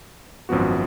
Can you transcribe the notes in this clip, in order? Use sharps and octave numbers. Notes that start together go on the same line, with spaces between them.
G#1 F#2 F3 B3 F#4